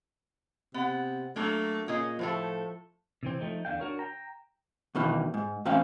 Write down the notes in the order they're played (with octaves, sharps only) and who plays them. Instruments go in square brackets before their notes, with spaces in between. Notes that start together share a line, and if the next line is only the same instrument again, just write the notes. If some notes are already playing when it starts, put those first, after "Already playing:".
[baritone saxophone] C3 [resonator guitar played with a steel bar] B3 F#5
[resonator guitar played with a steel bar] F#3 A#3 D4 [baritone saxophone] A3
[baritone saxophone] A#2 [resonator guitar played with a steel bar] C#4 G#4 D#5
[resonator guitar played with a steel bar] A2 A3 A4 [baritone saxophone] F3
[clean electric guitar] C3 E3 C4
F3 A3 D#4
E2 D3 F5 G5
D4 F#4 A#4 C#5
G5 A#5
[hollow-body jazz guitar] E2 B2 D#3 E3
G#2
E2 A2 C4 C#4 F5